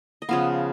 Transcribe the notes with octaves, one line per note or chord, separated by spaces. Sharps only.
D#5
C#3 F3 B3 F5